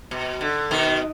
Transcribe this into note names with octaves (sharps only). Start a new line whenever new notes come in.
B2
D3
B2 D#3